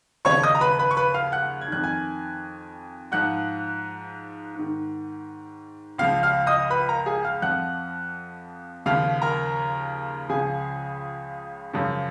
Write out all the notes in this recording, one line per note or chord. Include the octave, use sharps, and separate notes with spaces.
D#2 C#3 F3 C#5 C#6
D#5 D#6
A#5
B4 B5
B4 B5
C#6
B4 B5
F5 F6
F#5 F#6
G#6
F2 D#3 F#6
G#5 G#6
G#2 F3 F#5 F#6
G#2 D#3
C#2 C#3 F3 F5 F6
F5 F6
D#5 D#6
B4 B5
A#4 A#5
G#4 G#5
F5 F6
F2 F3 F#5 F#6
D#2 C#3 F3 F5 F6
A#4 A#5
C#2 C#3 F3 G#4 G#5
F#2 C#3 F3